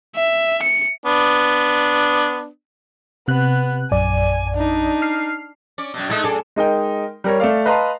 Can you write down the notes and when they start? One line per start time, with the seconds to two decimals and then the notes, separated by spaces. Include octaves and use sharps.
0.15 E5
0.63 C#7
1.05 B3 D4
3.28 C3 B3 F#6
3.91 A#1 F#2 D5 G#5
4.54 D4 D#4
5.02 F6 C7
5.78 C#4 D5
5.94 F#2 B2
6.10 G#3 A3 D#4 E4 A4
6.24 F#2 G#4 A4 D5
6.56 G#3 D#4 A#4 G5
7.24 G3 A#4 C#5
7.40 A3 A4 D5 F5
7.66 B4 D#5 F5 A5 A#5 C6